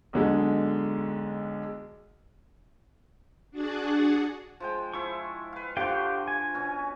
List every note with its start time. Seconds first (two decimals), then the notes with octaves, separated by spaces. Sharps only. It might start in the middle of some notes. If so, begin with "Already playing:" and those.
0.13 B1 D3 G#3
3.51 D4 F#4 G#4 D5 F#5
4.60 F3 G#3 G5
4.94 F3 E4 C#6
5.53 B4 F5
5.77 D3 F3 F#4 G4 F5 G5
6.28 G#5
6.54 B2 C#4